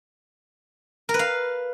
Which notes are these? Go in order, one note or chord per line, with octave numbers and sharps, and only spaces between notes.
A#4
B4
F5